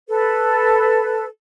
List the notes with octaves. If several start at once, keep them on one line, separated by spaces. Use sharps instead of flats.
A4 B4